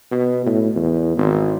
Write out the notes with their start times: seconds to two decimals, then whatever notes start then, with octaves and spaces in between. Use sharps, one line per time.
0.12 B2
0.46 A2
0.76 E2
1.17 G#1